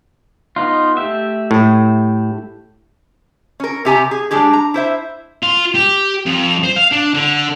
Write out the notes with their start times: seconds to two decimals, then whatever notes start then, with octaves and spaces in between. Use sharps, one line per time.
0.56 B3 D#4 F4
0.97 A3 G4 E5
1.51 A2
3.60 C#4 A#4
3.85 C3 G4 G#5 A#5
4.11 G#4
4.31 G3 G#3 D4 G4 G#4
4.53 A#5
4.74 E4 C5 E5
5.43 F4
5.75 G4
6.26 F2
6.64 C5
6.76 F5
6.91 D4
7.14 D3